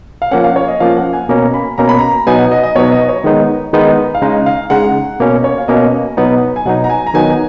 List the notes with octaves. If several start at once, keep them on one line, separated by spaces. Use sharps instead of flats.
F5
F3 A#3 C#4 F#5
F5
C#5
D#5
F3 A#3 C#4 F5
F#5
G#5
B2 A#3 C#4 A#5
B5
B2 A#3 C#4 A#5
B5
A#5
B2 F#3 B3 D#4 G#5
F#5
D#5
D#5
B2 F#3 B3 D#4 C#5
D#5
C#5
D#3 G#3 B3 D#4
D#3 G#3 B3 D#4
F5
C#3 G#3 D#4 D#5
F5
C#3 G#3 D#4 F#5
B2 A#3 C#4
C#5
F5
B2 A#3 C#4 D#5
B2 F#3 B3 D#4
G#5
B2 F#3 B3 D#4 F#5
A#5
G#5
A#5
D#3 F#3 B3 D#4 G#5